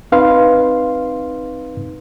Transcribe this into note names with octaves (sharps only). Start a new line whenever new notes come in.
C4 D#4 B4 F5 C6